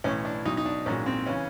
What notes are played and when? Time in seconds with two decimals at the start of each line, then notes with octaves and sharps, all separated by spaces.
0.04 B1 A2 E3 C#4
0.25 D4
0.45 B1 B2 F#3 D#4
0.57 D#4
0.66 D4
0.86 A#1 G#2 D#3 F#3 C#4
1.06 C4
1.26 C#3 E3 C#4